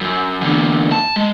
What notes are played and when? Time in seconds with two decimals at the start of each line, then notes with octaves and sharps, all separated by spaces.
0.01 F#2
0.41 E2 D3
0.92 A5
1.16 G#3